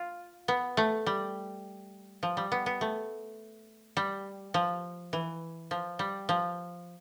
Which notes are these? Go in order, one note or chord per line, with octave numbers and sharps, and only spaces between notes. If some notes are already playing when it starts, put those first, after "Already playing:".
Already playing: F4
B3
A3
G3
F3
G3
B3
B3
A3
G3
F3
E3
F3
G3
F3